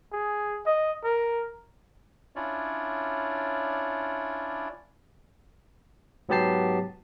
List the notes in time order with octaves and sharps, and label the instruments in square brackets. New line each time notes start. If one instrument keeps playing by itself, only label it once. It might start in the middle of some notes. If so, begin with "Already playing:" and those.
[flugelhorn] G#4
D#5
A#4
[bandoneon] C#4 D4 E4 F4 C#5 D5
[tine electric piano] G#2 F#3 B3 G4 A5 C7